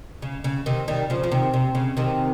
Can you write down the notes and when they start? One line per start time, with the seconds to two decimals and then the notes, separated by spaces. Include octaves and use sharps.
0.22 C#3
0.44 C#3
0.66 C3 D#3
0.88 D#3 G3
1.10 C#3 F3
1.23 F3
1.31 C3 D#3
1.54 C3
1.75 C#3
1.97 C3 D#3